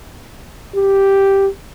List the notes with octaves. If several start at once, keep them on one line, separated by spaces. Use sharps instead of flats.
G4